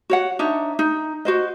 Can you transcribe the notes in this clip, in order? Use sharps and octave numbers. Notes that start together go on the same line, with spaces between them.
F#4 C#5 F#5
D4 D#4 C#5 E5
D#4
F#4 C5 D#5